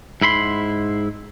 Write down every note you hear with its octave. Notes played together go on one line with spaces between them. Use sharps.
G#2 E4 B5 C6